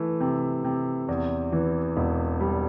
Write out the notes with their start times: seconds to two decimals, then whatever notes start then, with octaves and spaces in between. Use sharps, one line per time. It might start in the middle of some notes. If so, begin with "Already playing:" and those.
Already playing: E3 A3
0.20 C3
0.64 C3
1.08 E2
1.52 E3
1.97 E1
2.40 G3